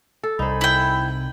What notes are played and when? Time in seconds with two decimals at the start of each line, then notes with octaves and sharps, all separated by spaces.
0.23 A4
0.39 C2 D#4 A4 C5 G#5 B5
0.61 E4 G5